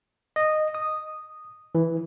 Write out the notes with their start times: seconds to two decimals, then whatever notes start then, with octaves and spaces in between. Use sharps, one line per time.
0.36 D#5
0.75 D#6
1.75 E3